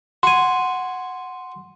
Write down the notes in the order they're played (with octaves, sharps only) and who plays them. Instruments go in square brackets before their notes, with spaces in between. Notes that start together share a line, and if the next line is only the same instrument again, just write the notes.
[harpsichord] F#4 G#5 [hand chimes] C6